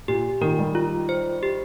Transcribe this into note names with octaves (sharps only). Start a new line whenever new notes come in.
A#2 G4
A#2 D#3 A#4
D#3 G3
F4
C5
G4